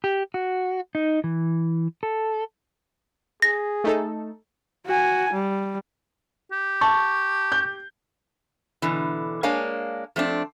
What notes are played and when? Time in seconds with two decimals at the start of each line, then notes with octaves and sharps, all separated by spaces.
0.04 G4
0.34 F#4
0.95 D#4
1.24 E3
2.03 A4
3.42 G#4 A#6
3.84 A3 D#4 A4
4.86 F#4 G#5
5.33 G3
6.51 G4
6.81 A5 C#6
7.52 G6
8.82 B2 D3 E3
9.43 G#3 A#3 D4 C#5 F5 G#5
10.16 F3 A3 C4 D4